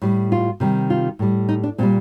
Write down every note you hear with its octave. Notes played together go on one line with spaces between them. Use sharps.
A2 G3
F4
C3 D#3 G3
F4
A2 G3
D#4
D4
A#2 G3 C4